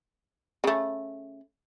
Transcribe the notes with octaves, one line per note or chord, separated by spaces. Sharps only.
C#3 A3